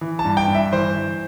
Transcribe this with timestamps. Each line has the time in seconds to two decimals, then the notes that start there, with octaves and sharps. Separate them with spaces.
0.01 E3
0.19 A5
0.25 G2
0.37 G5
0.48 G2
0.54 E5
0.72 E3 C5
0.96 E3